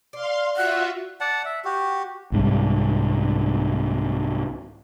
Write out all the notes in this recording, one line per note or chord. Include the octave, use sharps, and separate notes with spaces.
D5 F5 C6
F4 F#4 E5 F#5
D5 F#5 A5
E5
F#4 G4
C2 G#2 G3